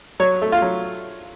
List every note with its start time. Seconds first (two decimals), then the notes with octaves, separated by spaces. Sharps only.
0.20 F#3 C#5
0.42 A3
0.52 F4
0.62 F#3